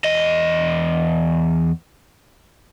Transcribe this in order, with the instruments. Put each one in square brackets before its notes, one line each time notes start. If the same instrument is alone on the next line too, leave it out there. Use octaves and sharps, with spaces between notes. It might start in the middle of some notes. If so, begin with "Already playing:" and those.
[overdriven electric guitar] E2 D#5